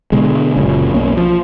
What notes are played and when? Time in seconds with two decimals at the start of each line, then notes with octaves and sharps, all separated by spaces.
0.12 B2 D3 G#3
0.57 F#1 A#2 C#3
0.94 B1 A#2 A#3 C#4
1.17 F3